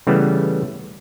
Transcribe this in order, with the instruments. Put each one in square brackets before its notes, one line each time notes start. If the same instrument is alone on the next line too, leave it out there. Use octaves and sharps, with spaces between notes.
[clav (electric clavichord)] C#3 E3 G3 A3 B3